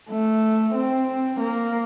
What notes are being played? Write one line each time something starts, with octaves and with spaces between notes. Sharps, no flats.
A3
C4
A#3